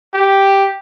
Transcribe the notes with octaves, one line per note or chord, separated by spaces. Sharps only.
G4